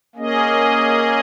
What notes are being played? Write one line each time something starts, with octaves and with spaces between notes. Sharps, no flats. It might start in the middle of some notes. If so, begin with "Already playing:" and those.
A#3 C#4 G#4 D#5